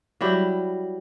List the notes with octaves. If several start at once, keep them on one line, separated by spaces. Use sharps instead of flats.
F#3 G3 E4 G4